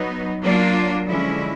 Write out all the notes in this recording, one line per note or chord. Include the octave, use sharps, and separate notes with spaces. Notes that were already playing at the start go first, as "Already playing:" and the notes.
Already playing: F#3 B3 D#4
F#3 A#3 D4 F4
D3 F3 G#3 C#4 E4